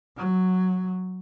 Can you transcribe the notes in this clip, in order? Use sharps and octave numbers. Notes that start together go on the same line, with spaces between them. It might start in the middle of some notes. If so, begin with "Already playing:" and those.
F#3